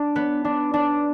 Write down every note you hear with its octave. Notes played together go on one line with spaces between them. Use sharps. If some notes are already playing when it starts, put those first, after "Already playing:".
Already playing: D4
B3
D4
D4